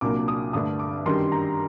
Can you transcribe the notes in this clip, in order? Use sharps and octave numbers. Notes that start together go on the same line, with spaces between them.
C2 A#2 F#3 A#3 D4 D6
D#6
G2 D3 A3 D4 D#6
D6
F#2 D#3 G3 D4 C6
A#5